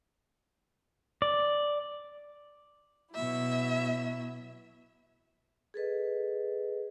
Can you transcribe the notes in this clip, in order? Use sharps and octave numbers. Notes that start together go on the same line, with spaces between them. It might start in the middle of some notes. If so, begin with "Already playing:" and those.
D5
B2 F#3 E4 E5
G#4 A4 B4 D#5